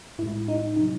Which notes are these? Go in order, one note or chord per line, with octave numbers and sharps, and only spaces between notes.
A2 G#3 E4
D#4
C3 F#3 D#4